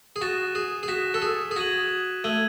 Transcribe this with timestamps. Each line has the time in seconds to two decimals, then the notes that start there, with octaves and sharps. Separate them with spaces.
0.16 G#4
0.21 F#4 C#6 F#6 A6 E7
0.55 G#4
0.83 G#4
0.88 F#4 F#6 B6 E7
1.14 A4
1.22 G#4
1.51 G#4
1.56 F#4 D#6 G#6 D#7 F#7
2.24 A3 D#6 G#6 D#7 F#7